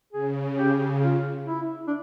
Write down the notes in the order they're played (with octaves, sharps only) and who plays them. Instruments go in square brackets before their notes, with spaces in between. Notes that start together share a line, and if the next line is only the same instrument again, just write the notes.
[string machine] C#3 [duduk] G#4
[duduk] G4
F4
E4
D4